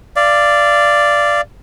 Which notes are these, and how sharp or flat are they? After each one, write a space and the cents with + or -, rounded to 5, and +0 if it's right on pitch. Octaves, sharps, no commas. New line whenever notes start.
D5 +0 F5 -30